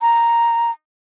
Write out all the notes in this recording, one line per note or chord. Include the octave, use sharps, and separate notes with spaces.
A#5